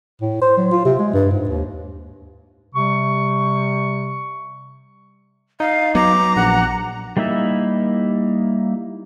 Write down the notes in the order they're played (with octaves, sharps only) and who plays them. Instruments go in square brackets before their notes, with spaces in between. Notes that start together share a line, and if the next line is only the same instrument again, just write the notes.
[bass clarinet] A2
C5
F#3
F4
C3
G#3
G2
G#2
D#2
[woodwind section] C3 G3 C#6
[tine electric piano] D#4 [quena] F5
[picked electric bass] F#3 B3 [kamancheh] A#5 [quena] D6
[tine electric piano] A#1 [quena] F#5
[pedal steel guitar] G3 A#3 D#4 E4 E5